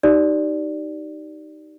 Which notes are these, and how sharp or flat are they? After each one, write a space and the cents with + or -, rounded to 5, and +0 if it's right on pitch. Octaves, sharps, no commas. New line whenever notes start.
D#4 -5 G4 -30 D5 +0